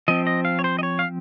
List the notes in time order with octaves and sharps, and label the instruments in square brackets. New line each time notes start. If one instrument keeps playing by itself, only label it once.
[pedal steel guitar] F3 C4 D#5
D#5
F5
C#5
C5
D#5
C#5
F5